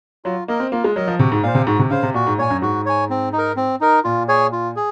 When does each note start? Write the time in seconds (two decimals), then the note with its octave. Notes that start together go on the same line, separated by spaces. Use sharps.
0.25 F#3 F4
0.48 A#3 A#4 D#5
0.60 C4
0.72 A#3 F4
0.84 G#3
0.96 F#3 A#4 D#5
1.07 F3
1.19 C3 F#4
1.32 G#2
1.43 A#2 F5
1.47 C5
1.55 C3
1.67 G#2 F#4
1.79 C3
1.90 C#3 C5 F5
2.03 C3
2.14 A#2 F#4
2.27 G#2
2.38 A#2 C#5 G#5
2.50 F#2
2.62 G#2 F#4
2.86 C#5 G#5
3.10 C4
3.33 D#4
3.38 A#4
3.57 C4
3.81 D#4 A#4
4.04 A#2 F4
4.28 G#4 C#5 G#5
4.52 F4
4.76 G#4